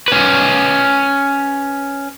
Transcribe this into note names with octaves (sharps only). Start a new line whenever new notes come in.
C#4 B4